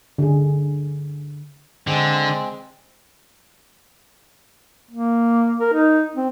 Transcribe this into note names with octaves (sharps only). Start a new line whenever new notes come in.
D3 G#4
D3 G#3 C4
A#3
A#4
D#4
C4